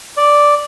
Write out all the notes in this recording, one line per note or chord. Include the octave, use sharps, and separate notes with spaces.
D5